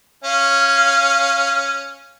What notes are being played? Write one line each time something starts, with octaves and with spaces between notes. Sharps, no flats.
C#4 F5